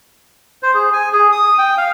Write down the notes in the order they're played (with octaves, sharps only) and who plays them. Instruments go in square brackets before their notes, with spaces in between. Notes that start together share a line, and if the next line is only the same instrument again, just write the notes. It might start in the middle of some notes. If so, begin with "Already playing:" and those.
[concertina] C5
G#4
G#5
G#4
D#6
G5
F5